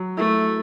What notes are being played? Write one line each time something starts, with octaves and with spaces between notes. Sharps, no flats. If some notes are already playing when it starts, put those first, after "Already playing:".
Already playing: F#3
A3 E4